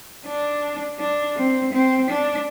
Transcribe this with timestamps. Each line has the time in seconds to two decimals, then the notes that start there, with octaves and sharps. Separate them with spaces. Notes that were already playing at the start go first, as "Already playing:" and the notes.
0.26 D4
0.99 D4
1.37 C4
1.73 C4
2.10 D4